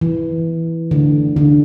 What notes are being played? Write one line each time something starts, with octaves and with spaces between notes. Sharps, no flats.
E3
D3
D3